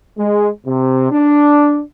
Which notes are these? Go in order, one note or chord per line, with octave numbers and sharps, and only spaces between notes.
G#3
C3
D4